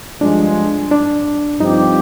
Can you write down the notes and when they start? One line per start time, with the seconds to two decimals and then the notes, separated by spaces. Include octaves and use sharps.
0.21 G2 F3 G#3 D4
0.91 D4
1.60 G2 F3 C4 D#4 G4